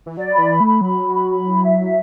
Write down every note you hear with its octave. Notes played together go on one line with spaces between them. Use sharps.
E3
F#3 D5
B5
E3
B5
A3 B5
F#3 B5
F#4
B5
B5
E4
E5
E4